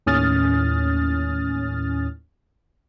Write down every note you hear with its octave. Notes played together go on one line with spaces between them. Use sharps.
D#2 A2 C#4 D#6 F6 A6